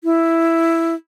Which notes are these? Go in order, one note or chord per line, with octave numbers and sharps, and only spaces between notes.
E4